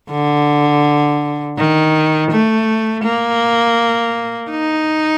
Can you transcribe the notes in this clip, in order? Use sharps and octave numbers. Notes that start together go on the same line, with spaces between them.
D3
D#3
A3
A#3
D#4